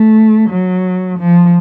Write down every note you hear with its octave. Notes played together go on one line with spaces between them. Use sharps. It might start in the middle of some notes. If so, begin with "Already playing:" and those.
Already playing: A3
F#3
F3